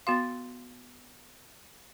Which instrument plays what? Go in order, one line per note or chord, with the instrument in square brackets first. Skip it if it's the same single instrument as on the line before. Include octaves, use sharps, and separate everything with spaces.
[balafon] B3 F#4 F5 [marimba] C6 A6